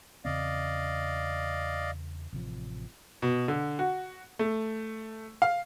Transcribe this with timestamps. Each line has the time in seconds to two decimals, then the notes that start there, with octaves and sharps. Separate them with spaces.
0.25 E2 C#3 C4 D5 D#5 F5
2.33 A1 C3 F3
3.22 B2
3.48 D3
3.79 F#4
4.39 A3
5.42 F5